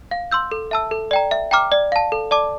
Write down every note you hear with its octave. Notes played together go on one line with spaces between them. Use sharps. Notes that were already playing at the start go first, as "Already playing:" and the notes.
F5
C6 E6 G6
A4
E5 A5 E6
A4
D5 G5 A#5
E5
G5 A#5 D6 F6
D5
F5 A5
A4
D5 A5 D6